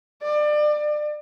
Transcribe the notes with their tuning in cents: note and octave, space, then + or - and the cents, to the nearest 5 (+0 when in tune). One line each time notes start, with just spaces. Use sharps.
D5 +30